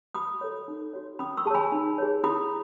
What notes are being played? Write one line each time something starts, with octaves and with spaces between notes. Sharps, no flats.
F#4 B5 D#6
A4 C#5
D#4
F#4 C#5
C#4 B5 D#6
C#6 E6
G#4 C#5 G#5 A5 B5
D#4
G#4 C#5
E4 B5 D#6